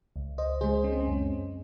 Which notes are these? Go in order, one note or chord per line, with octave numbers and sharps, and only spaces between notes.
C#2
C5 D#5
C#3 G#3 G#4 C5
C#4
C4
C#4
F#2